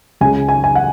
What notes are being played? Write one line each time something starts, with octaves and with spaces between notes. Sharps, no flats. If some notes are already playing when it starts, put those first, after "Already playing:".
C#2 C#3 G#3 G#5
G#5
G#5
F#5